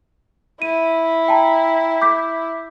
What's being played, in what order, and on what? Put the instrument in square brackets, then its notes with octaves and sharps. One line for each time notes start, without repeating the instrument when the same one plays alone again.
[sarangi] E4 [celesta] D#7
[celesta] G5 A5 A#5
D6 G6 B6